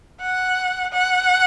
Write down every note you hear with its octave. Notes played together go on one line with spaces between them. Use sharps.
F#5
F#5